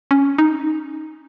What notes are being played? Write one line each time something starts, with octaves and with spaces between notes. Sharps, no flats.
C#4
D#4